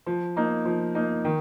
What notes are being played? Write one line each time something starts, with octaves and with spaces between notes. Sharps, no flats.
F3
A#3 D#4
F3
A#3 D#4
D#3